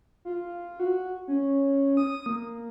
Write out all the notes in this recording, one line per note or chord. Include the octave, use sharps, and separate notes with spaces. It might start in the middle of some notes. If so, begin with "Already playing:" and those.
F4
F#4
C#4
D#6
A#3